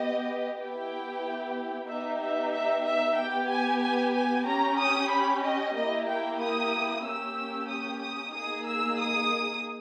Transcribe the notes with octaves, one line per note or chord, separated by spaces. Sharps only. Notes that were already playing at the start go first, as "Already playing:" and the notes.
Already playing: B3 G4 D#5
B3 E4 G4 G5
B3 D#4 G4 E5
E5
E5
E5
B3 G4 G5
G#5
G#5
G#5
C#4 G4 A#5
D#6
B5
D#5
A#3 E4 G4 D#5
G5
D#6
A#3 C#4 G4 E6
D#6
D#6
A#3 D#4 G#4 D#6
E6
D#6